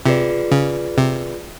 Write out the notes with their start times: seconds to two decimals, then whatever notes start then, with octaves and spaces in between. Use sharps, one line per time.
0.06 C3 F4 G#4 B4 D5
0.51 C#3
0.98 C3